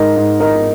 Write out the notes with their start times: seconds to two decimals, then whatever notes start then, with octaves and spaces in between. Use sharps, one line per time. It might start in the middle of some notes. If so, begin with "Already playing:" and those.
Already playing: G#2 A#4 D#5
0.16 G#2
0.40 D#4 A#4 D#5